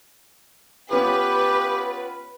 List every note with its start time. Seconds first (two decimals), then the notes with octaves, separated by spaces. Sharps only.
0.91 B3 C#4 F4 G4 B4